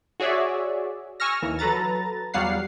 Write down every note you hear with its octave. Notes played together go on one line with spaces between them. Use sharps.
F#4 G#4 C#5 D5 E5
G#5 C#6 E6 F6 A#6
D#2 E3
F#3 A4 B4 A#5 A6
E2 F#3 G3 F5 F#5 C7